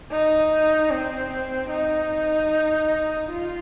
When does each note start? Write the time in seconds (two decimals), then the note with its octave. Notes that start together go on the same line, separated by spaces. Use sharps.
0.11 D#4
0.91 C4
1.70 D#4
3.30 F4